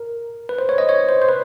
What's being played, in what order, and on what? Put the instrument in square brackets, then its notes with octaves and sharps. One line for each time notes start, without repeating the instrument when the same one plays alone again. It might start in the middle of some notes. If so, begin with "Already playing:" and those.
Already playing: [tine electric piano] A#4
B4
C5
C#5
D#5
C#5
C5
C5
B4